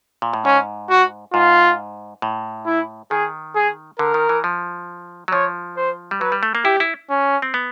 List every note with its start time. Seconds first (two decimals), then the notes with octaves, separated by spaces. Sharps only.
0.22 A#2
0.34 A2
0.45 G#2 C#4
0.90 F#4
1.33 G#2 F4
2.22 A2
2.66 E4
3.11 D#3 G#4
3.55 G#4
3.99 D3 A#4
4.14 D#3
4.29 E3
4.44 F3
5.28 F#3
5.32 F3 C#5
5.77 C5
6.11 G3
6.21 F#3 B4
6.32 G3
6.43 A3
6.55 A#3
6.65 E4 G4
6.80 E4
7.10 C#4
7.42 C4
7.54 B3